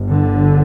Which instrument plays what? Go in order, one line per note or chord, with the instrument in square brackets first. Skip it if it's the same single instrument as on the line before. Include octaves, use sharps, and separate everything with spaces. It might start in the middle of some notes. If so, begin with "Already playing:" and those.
Already playing: [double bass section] G1 G2
D3